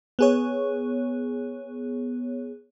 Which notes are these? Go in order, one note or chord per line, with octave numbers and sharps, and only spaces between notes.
B3 G#4 C#5